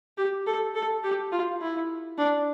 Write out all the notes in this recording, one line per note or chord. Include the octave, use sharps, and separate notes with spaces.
G4
A4
A4
G4
F4
E4
D4